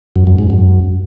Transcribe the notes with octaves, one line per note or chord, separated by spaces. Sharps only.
F#2
F#2
G#2
F#2